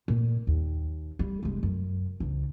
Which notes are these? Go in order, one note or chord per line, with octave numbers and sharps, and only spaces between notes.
A#2
D#2
G3
F1 G#3
F#2
C#2 D4